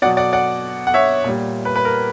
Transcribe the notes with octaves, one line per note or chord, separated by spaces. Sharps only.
B2 F#3 D5 F#5
D5 F#5
D5 F#5
F#5
C#5 E5
A#2 G3
B4
B4
A#4